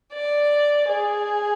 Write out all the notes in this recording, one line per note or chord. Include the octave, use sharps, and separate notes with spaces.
D5
G#4